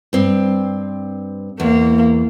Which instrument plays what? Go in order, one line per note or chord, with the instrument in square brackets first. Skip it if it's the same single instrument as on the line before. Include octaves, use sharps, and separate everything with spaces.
[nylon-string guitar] G2 C4
[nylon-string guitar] E2 [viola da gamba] A#3